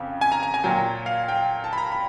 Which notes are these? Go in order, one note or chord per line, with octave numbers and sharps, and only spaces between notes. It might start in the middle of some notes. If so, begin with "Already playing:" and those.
Already playing: F2 C#3 F5
G#5
A#5
A#5
G#5
A#2 F#3 G5
F5
G5
A5
B5
A#5
B5